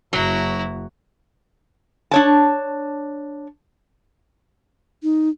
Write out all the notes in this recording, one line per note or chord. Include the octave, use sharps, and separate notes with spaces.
F#1 F#3 E4 A#5
D4 C#5 A5
D#4